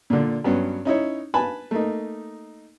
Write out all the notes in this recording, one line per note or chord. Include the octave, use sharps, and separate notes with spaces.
A#2 D3
G2 F#3 B3 C#4
C#4 D#4 E4 C#5
B4 G#5 A5 B5
A3 A#3 D#4